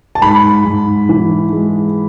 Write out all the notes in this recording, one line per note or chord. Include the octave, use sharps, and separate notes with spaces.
A5
G#2 B5
G#2
E3
G#3